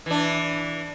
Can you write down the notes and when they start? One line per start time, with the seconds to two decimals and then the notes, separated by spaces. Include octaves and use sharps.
0.06 E3 D4